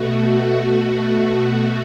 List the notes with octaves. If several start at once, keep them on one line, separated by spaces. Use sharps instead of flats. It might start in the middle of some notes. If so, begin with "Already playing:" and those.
Already playing: B2 A3 F#4
F#4